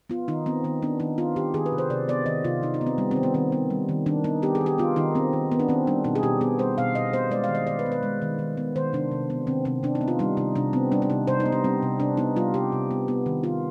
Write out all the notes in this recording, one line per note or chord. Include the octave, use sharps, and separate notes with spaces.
B3 F4
D#3 D#4
B3 C4
D#3 B3
B3 D4
D#3 D#4
B3 F4
D#3 G4
D#3 G#4
B4
C3
C5
C3 D5
B3 D5
D#3 D#5
C3 F4
C3 D#4
D#4
B3
C4
G3 B3
D#3 C4
B3
D#3 C4
B3
G3
D#3
D#3 D4
B3 D#4
B3 G4
G#4
D#3
G4
B3 F4
D#3 D#4
B3 C4
D#3
B3
D4
D#3 C4
G3 D4
B2 D#4
G#4
B2 G4
B3 G#4
G3 C5
B2 F5
B2 D#5
B3 C5
G#3 D5
D#3 F5
D#5
D#3 D5
B4
B3
B4
G#3
D#3
D#3
B3
D#3 C5
C3 D4
C3
B3
D#3 C4
C3 C4
C3 D4
D#4
B3
F4
G3 D#4
C3 D#4
C3 D4
B3 C4
G3 D4
D4
C3 D#4
C3 C5
D#4
B3
D4
G3 C4
C3
C3 D4
B3 D#4
G3 F4
C3 G4
C3
B3
B3
D#3
B3 F4